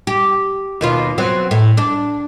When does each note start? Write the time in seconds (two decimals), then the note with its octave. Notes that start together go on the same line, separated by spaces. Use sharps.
0.07 G4
0.81 D#2 B2 F4
1.18 F#3 B3 C4
1.51 A2
1.77 D4